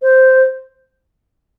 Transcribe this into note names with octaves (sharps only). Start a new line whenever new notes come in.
C5